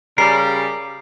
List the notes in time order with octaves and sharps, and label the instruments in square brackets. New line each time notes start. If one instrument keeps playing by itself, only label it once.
[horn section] C#3 G3 [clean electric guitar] A#4 [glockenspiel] C7